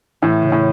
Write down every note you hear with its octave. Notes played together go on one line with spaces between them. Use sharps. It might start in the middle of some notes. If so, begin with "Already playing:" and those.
A2 E3
C#3
A2